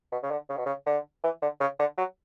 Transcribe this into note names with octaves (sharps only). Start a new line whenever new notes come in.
B2
C#3
D3
C#3
B2
C#3
D3
E3
D3
C#3
D3
F#3